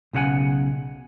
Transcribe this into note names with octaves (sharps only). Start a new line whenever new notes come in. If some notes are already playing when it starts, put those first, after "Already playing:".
B1 C#3 F#4 F#5 G#5